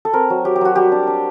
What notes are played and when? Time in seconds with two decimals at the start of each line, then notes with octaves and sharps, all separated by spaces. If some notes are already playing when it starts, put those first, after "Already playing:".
0.05 A4
0.13 C4 A#4
0.30 F#3
0.45 F#3 G4
0.56 G4
0.61 F#3 F#4
0.76 G3 G4
0.92 D4
1.07 D4